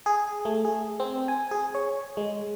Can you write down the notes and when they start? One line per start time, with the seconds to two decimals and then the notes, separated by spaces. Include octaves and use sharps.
0.06 G#4
0.45 A3
0.65 G#4
1.00 C4
1.28 G#5
1.51 G#4
1.75 C#5
2.17 G#3